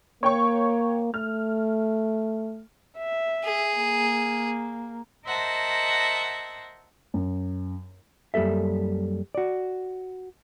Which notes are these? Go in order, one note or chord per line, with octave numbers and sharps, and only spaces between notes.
A#3 C#5 G5 C#6
A3 F6
E5
G#4
A#3
A#4 C5 D#5 E5 F#5 A5
F#2
F#2 G3 A#3 A4 E5
F#4 D5